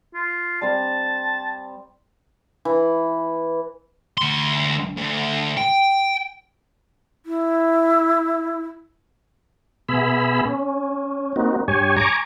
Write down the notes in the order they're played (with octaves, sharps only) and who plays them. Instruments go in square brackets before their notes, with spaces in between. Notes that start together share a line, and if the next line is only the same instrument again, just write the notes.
[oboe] F4
[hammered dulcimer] G3 C4 A#5 [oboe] A5
[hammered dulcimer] E3
[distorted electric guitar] D2 C6
D2
G5
[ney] E4
[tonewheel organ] B2 B3 G#4 E5 B5
C#4
A#3 C4 D#4 F#4
G2 G4 C#5 G#5
G#5 A#5 C#6 D6